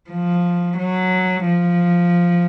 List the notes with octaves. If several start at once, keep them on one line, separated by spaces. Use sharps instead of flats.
F3
F#3
F3